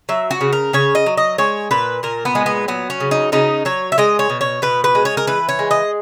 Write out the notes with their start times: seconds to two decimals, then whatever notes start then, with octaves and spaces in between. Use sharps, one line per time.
0.09 F#3 E5
0.31 F#4
0.41 C#3
0.53 A#4
0.73 C#3 C#5
0.95 D#5
1.06 F#3
1.17 D#5
1.38 G#3 C#5
1.71 A#2 B4
2.03 A#2 A#4
2.25 B3
2.35 G#3
2.46 B3
2.68 F#3 B3
2.90 C#4
3.00 C#3
3.11 D#4
3.32 C#3 D#4
3.65 F#3 C#5
3.92 E5
3.98 G#3 D#5
4.19 C#5
4.30 B2
4.41 C#5
4.62 B2 B4
4.84 B4
4.95 G#3
5.05 C#5
5.17 A#4
5.27 E3 B4
5.49 C#5
5.59 G#3
5.71 D#5